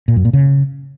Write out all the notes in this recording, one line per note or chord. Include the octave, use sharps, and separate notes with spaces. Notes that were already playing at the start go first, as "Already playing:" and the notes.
A#2
F#2
A#2
C#3